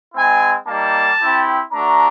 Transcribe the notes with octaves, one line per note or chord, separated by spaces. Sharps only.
G#3 C4 E4 G#5
G3 A#3 D#4 A5
C4 E4 G4
A3 D4 F#4 A#5